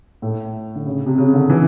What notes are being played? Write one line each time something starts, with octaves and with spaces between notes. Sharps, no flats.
A2
D3
C#3
C3
C#3
D3
E3